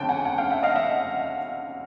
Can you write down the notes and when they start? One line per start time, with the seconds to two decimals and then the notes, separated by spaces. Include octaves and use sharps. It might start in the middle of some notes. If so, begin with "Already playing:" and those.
Already playing: G1 F2 C#3 G5 A5
0.09 F#5 G#5
0.25 F#5 G#5
0.38 F5 G5
0.51 E5 F#5
0.63 D#5 F5
0.75 E5 F#5